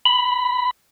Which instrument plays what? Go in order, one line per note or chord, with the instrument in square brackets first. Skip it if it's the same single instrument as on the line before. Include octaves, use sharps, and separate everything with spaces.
[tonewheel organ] B5